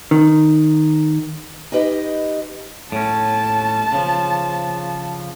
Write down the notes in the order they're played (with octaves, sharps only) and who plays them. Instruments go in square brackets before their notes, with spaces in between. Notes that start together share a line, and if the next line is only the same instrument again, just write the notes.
[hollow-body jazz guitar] D#3
[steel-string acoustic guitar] D#4 G4 B4 D#5
[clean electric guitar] A2 C#4 [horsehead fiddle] A5
[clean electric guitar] C#3 F3